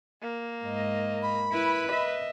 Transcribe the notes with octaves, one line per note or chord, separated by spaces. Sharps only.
A#3
G#2 D#5
B5
E4 B4
D#5 E5